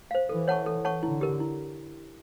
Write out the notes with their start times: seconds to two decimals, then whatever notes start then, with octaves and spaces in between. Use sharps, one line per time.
0.11 C5 F5
0.29 E3 A4
0.48 C#5 F#5 A5 C#6
0.66 A4
0.85 C#5 F#5 A5 C#6
1.03 D3 E4
1.21 G4 A#4
1.40 E4